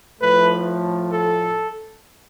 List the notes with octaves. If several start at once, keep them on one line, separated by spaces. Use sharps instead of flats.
A2 F3 A3 B4
A4